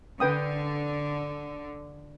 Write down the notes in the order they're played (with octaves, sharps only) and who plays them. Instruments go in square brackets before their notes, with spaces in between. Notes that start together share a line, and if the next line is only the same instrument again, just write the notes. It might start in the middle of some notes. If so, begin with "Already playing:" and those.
[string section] D3 [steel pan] B4 G5 D#6